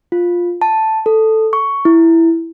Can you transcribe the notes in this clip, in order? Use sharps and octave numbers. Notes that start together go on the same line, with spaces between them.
F4
A5
A4
C#6
E4